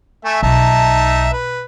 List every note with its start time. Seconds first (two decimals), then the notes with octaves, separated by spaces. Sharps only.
0.25 A3 E5 G#5
0.43 B1 D#4 E5 A5
1.33 B4